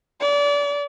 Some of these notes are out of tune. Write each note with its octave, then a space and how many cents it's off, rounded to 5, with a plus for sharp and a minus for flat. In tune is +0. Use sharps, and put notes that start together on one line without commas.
D5 -30